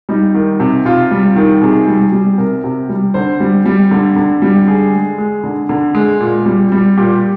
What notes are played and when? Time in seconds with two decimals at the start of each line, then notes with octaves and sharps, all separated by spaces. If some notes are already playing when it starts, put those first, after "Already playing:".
0.09 G3 D#4
0.34 D#3
0.60 C3
0.85 C3 F4
1.11 G3
1.36 D#3
1.61 C3 G#4
1.88 G3
2.12 G3
2.38 C3 A#4
2.64 C3
2.89 G3
3.14 D3 C5
3.40 G3
3.66 G3
3.91 D3
4.16 D3
4.42 G3
4.68 D3 G#4
4.93 G#3
5.18 G#3
5.44 D3
5.69 D3
5.95 G#3
6.20 A#2
6.46 G3
6.72 G3
6.97 A#2 G4